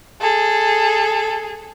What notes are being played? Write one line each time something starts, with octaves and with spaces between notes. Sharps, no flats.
G#4 A4